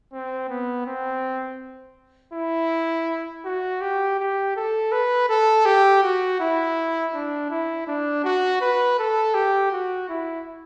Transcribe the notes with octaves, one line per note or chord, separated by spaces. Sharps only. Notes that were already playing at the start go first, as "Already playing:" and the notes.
C4
B3
C4
E4
F#4
G4
G4
A4
B4
A4
G4
F#4
E4
D4
E4
D4
F#4
B4
A4
G4
F#4
E4